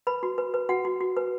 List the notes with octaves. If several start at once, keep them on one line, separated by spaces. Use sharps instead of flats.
B4 B5
F#4
B4
B4
F#4 F#5
F#4
F#4
B4